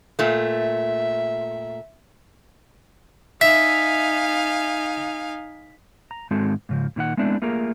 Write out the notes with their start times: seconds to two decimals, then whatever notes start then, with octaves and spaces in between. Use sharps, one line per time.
0.19 A#2 A3 E5
3.41 D#4 E5 F5 G#5 B6
6.11 A#5
6.31 G#2 D#3 G#3 C4 F#4 A4
6.69 G#2 C#3 F3
6.96 A#2 D#3 E4 F#5
7.17 G#3 A3 B3 C4 D4 E4
7.42 A3 A#3 F4 G#4 A#4